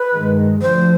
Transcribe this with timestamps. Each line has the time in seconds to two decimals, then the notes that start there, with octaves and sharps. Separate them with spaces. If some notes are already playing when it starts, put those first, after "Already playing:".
Already playing: B4
0.13 G2 D#3 G#3
0.62 D2 D3 F3 C5